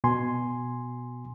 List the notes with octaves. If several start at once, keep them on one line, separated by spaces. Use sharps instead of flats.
B2 G#5 C6